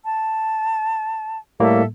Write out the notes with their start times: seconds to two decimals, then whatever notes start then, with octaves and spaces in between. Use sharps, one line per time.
0.04 A5
1.60 A2 G3 A#3 A4 E5